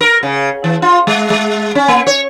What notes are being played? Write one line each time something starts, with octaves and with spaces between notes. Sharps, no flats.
A#4
C#3
E3
F4
G#3
G#3
C#4
A#3
C#5